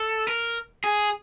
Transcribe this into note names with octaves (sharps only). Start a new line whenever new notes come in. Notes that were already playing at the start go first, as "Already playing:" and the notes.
Already playing: A4
A#4
G#4